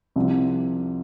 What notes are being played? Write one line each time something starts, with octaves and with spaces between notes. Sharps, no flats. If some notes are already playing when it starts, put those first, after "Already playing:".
C2 C3 F3 C4